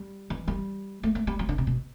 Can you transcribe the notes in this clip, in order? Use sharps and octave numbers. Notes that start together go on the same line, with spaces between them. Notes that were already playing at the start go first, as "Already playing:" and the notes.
Already playing: G3
E3
G3
A3
A3
G3
F#3
D3
C3
B2